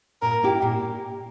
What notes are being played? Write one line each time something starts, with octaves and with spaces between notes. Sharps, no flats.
A#2 A#4
A#3 E4 G4
A#2